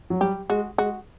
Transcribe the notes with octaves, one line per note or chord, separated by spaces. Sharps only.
F#3
G3 G4
G#3 F#4
G#3 F#4